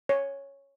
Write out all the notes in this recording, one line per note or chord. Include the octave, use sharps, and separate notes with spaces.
C#5